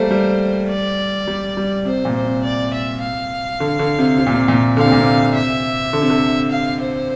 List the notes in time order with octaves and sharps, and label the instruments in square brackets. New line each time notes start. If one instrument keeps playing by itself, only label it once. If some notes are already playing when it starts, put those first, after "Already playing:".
Already playing: [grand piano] G3 A3 A#3 [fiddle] C5
[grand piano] G3
[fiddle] D5
[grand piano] G3
G3
[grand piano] C3 [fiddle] C5
[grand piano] A#2
[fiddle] C5
[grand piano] C3
[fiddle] D5
E5
F5
[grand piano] D3
D3
C3
C3
A#2
C3
A#2
[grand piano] D3 [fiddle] F5
[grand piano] C3
A#2
C3
[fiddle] E5
[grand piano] D3
C3
D3
[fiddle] F5
C5